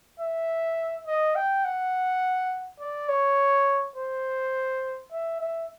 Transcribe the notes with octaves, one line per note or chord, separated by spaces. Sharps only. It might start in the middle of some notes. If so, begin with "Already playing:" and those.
E5
D#5
G5
F#5
D5
C#5
C5
E5
E5